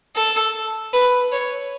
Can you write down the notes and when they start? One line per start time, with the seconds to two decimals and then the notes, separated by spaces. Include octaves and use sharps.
0.16 A4
0.93 B4
1.32 C#5